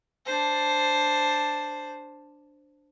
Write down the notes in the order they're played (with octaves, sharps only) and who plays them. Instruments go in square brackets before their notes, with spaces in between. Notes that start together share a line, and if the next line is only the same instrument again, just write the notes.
[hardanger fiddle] D4 C5